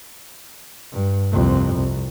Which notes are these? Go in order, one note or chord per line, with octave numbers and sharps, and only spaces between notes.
G2
C2 F2
C2